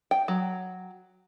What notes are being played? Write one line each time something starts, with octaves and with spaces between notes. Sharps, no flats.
G5
F#3